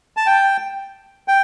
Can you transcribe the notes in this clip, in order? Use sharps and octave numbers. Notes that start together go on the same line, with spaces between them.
A5
G5
G5